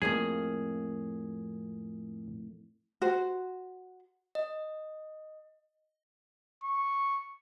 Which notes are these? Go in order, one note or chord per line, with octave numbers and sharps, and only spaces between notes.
F2 A2 A#3 G#4
F#4 C5
D#5
C#6